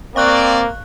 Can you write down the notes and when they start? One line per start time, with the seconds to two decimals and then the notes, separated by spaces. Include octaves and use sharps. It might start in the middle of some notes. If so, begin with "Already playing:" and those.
0.16 A#3 C4 C5 D5 F5 C#6 F#6